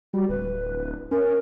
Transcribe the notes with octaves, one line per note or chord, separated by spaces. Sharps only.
G3 F#4
D1 B4
C#4 A#4